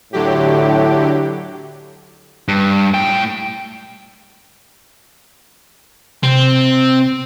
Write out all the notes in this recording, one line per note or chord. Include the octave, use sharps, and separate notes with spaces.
A2 D3 F#3 G4
G2
A2 G5
C3 C4